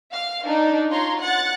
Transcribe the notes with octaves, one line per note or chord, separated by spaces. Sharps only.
F5
D4 D#4
F4 C#5 A#5 C6
F#5 F#6 A6